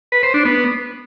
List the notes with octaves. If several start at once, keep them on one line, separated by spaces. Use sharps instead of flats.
B4
C5
D4
B3